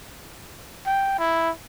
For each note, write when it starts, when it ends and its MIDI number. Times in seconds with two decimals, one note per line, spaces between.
0.86 1.18 79
1.19 1.50 64